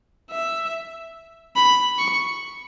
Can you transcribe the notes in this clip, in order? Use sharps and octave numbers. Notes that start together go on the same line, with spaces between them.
E5
B5
C#6